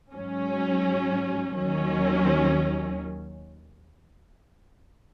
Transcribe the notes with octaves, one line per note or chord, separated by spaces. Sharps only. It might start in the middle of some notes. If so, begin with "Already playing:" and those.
G#2 F#3 C#4
D#2 D#3 F#3 C#4